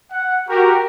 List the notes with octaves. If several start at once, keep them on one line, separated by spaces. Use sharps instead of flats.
F#5
F#4 G4 A#4